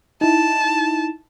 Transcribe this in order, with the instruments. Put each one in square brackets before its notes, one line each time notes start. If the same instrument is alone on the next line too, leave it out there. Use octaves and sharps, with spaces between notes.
[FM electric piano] D#4 E4 [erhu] A5